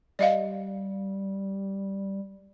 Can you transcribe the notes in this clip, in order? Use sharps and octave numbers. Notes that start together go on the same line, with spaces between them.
G3 D5 D#5 F5